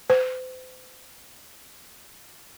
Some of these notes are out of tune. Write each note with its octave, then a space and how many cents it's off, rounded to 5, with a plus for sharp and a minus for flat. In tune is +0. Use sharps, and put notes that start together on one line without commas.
C5 -40